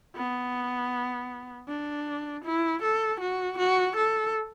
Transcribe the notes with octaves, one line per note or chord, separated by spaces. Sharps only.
B3
D4
E4
A4
F#4
F#4
A4